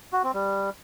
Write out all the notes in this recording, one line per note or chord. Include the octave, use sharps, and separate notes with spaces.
F#4
C4
G3